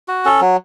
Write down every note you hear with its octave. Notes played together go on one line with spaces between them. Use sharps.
F#4
C#4 A4
F#3